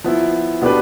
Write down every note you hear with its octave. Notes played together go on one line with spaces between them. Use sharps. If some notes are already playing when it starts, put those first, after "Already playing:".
F3 B3 E4
B2 B3 D4 G4 B4